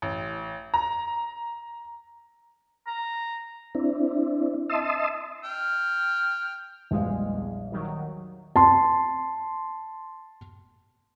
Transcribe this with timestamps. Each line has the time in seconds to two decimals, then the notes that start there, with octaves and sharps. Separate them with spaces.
0.02 A1
0.74 A#5
2.87 A#5
3.75 C4 D4 E4
4.69 D#5 E5 A5 C6 D#6 E6
5.44 G5 F6
6.91 A#1 E2 G3 G#3 F5
7.72 D#3 F#3
8.56 A5 C6